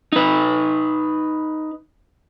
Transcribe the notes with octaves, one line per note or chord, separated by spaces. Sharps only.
D#4 B4